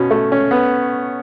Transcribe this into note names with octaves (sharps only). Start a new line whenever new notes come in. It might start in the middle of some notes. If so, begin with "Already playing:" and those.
Already playing: B2 C#4
A3
C#4
B3